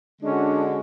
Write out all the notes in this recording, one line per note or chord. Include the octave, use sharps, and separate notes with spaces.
D3 G#3 C#4 D4 F#4